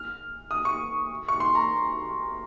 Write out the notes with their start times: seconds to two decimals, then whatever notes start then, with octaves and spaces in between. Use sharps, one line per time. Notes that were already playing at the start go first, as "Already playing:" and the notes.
Already playing: F6
0.51 D#6
0.65 C#6
1.28 C#6
1.40 C6
1.55 A#5